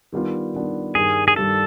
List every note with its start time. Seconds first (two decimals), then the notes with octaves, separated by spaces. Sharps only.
0.12 D#3 G3 B3 D4 F4
0.54 D#3 G3 B3 D4 F4
0.95 G2 D#3 G3 G#4
1.28 G#4
1.36 G2 D#3 G3 A4